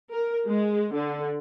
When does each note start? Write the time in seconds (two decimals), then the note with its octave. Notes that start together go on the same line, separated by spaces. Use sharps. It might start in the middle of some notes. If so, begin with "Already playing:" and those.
0.12 A#4
0.47 G#3
0.94 D3